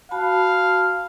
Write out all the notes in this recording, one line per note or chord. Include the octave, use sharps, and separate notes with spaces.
F#4 F5 A5 B5